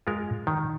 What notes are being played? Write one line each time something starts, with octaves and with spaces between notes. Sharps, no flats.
G#3 F4 A#4
D#3